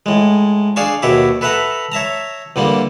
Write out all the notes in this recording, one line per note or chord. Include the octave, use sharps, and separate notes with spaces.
A2 G#3
D4 G#4 D5 F5 A5 C#6
D#2 B2 C#5 E5 D6
A4 B4 E5 F#5 A5 A#5
C#5 E5 A5 A#5
E2 D3 G3 A#3